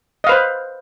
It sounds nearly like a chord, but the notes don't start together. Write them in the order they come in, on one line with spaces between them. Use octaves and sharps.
D#5 F5 B4 C5